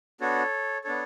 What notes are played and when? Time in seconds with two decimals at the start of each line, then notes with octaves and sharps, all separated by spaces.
0.21 B3 D4 F#4 A4 C#5
0.84 B3 D4 A4 C#5